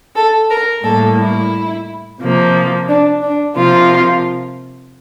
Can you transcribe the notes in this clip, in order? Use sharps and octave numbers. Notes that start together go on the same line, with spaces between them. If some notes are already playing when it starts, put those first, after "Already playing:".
A4
A#4
A2 G3 A#3 A4
E4
C3 F3 A#3
D4
D4
C3 F3 A#3 F4